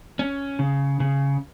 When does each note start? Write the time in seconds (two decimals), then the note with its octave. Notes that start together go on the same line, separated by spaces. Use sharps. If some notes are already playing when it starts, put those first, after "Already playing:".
0.19 C#4
0.59 C#3
1.00 C#3